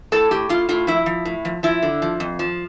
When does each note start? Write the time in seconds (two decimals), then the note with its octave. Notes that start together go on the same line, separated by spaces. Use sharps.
0.12 A2 A4
0.31 A2 G4
0.49 A2 F4
0.69 A2 F4
0.87 F3 E4
1.06 F3
1.25 A2
1.45 F3
1.63 F3 E4
1.83 D3
2.02 F3
2.20 F2
2.39 F3